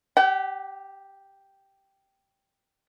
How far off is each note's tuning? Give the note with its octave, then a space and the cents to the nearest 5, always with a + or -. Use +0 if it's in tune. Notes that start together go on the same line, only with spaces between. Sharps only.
G4 +0 F#5 +45